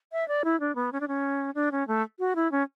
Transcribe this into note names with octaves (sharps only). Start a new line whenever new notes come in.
E5
D5
E4
D4
B3
C#4
D4
C#4
D4
C#4
A3
F#4
E4
C#4